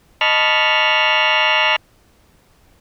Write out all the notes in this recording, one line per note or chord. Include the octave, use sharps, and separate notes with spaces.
D#5 A5 B5 C#6 F6